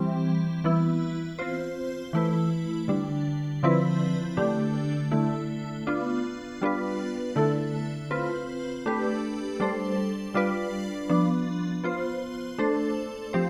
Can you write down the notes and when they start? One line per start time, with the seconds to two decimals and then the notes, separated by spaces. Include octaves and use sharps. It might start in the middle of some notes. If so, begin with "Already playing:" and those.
Already playing: E3 G3 C4
0.64 E3 B3 E4
1.39 C4 F4 C5
2.13 E3 A3 E4 B4
2.88 D3 G3 D4
3.63 D3 F3 C4 E4 B4
4.37 D3 A3 D4 G4
5.11 D3 A3 E4
5.87 B3 D4 F4
6.62 G3 B3 D4 F4 B4
7.36 D3 A3 E4 A4
8.11 C4 F4 B4
8.86 A3 D4 G4 B4
9.60 G3 D4 A4 C5
10.34 G3 D4 F4 B4 D5
11.09 F3 B3 D4
11.84 B3 F4 C5
12.58 A3 D4 A4 C5
13.33 F3 C4 G4 C5